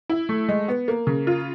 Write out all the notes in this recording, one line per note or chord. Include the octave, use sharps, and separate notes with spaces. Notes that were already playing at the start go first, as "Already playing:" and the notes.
E4
A3
G#3
B3
A#3
C#3
F4